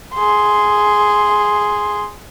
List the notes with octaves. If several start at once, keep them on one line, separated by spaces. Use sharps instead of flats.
G#4 C6